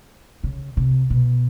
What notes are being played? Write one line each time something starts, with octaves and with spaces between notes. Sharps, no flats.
C#3
C3
B2